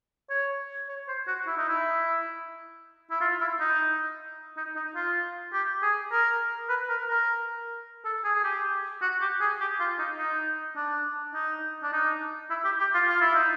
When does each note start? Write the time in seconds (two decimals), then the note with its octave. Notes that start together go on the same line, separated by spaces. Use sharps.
0.30 C#5
0.89 C#5
1.08 C5
1.27 F#4
1.47 E4
1.57 D#4
1.68 E4
3.11 E4
3.21 F4
3.41 E4
3.60 D#4
4.57 D#4
4.76 D#4
4.95 F4
5.53 G4
5.83 G#4
6.12 A#4
6.69 B4
6.89 A#4
7.09 A#4
8.05 A4
8.24 G#4
8.35 G#4
8.44 G4
9.02 F#4
9.21 G4
9.41 G#4
9.60 G4
9.80 F4
9.99 D#4
10.17 D#4
10.76 D4
11.34 D#4
11.83 D4
11.93 D#4
12.50 E4
12.64 G4
12.80 G4
12.94 F4
13.09 F4
13.21 E4
13.34 D#4